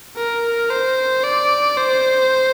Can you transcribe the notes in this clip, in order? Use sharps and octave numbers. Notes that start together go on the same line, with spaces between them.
A#4
C5
D5
C5